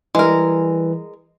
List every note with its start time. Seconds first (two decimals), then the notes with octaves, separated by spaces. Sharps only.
0.15 E3 G3 G#3 A#4